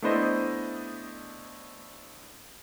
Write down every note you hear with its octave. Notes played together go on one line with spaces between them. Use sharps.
A3 B3 D4 E4 C5 D#5